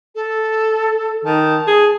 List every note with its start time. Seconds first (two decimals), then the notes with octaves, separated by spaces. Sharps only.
0.15 A4
1.25 D#3 A5
1.67 G#4